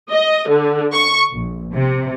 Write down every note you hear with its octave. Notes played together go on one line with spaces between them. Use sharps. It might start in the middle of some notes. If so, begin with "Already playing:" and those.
D#5
D3
C#6
A#1
C3